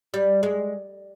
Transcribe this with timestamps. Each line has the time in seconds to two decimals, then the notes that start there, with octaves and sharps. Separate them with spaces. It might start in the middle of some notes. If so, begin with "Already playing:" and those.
0.14 G3
0.43 G#3